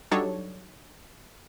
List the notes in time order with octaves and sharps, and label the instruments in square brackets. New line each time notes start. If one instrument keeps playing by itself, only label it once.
[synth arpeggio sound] F#3 G3 D4 D#4 A4 C#5